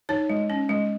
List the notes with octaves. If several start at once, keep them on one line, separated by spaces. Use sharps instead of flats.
D#4 C#5
G#3
C#4
G#3